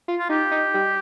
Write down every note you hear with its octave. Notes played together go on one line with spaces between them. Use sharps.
F4
F4
D#4 G4
D#4
G3